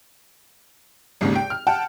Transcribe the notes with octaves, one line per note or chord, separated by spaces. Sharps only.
G#1 D#2 G#2 C#3
G5
F6
F#5 G5 A5